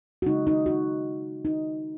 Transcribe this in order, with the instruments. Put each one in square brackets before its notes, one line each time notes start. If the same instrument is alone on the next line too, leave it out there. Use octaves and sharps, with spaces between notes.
[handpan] F#4
C#3 G#3 D#4
D#4
F#4
D#4